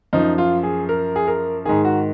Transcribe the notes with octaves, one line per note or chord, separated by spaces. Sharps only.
F#2 F3 D#4
F4
G#4
A#4
G#4
A#4
G#2 D#3 G#4
F#4